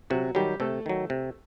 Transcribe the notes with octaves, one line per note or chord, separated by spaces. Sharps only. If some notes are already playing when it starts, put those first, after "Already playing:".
C3 F#3 F#4
D#3 F#3 G3 G4
C3 A3 A4
D#3 F#3
C3